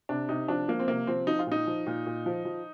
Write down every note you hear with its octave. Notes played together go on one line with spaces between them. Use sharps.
C3 D4
C3 D#4
F3 D4
F3 A#3
C4
C3 A#3
F3 C4
F3 D#4
F4
A#2 D#4
F3
A#2
A#2
F3
F3